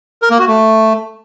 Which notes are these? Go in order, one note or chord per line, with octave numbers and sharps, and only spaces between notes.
A#4
A#3
F#4
A3